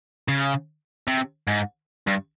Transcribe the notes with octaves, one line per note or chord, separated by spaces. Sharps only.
C#3
C3
G#2
G2